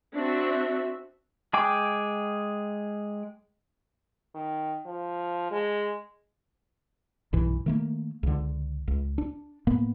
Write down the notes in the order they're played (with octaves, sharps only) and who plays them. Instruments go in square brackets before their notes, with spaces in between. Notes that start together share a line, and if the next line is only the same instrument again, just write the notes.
[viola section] C4 D4 F#4 E5
[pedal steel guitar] G#3 G#4 G5 D6
[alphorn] D#3
F3
G#3
[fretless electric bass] B1 G2 E3
D#3 A3 A#3
C#2 D3
C#2
D4
A2 A#3 B3